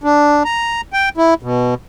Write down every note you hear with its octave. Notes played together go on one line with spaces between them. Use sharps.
D4
A#5
G5
E4
B2